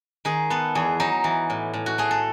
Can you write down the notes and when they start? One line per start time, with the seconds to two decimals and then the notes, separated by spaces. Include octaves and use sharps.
0.25 D#3 G#4
0.50 B3 A4
0.75 E2 G#4
1.00 F#3 D#4
1.24 E3
1.50 A2
1.73 A2
1.86 F#4
1.98 A3 G#4
2.11 A4